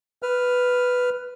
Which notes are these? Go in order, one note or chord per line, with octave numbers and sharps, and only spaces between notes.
B4 F6